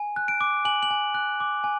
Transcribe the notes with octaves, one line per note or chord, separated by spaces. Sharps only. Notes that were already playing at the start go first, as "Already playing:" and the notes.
Already playing: G#5
F#6
D7
D6
G#5 F#7
F#7
G#5
F#6
D6
G#5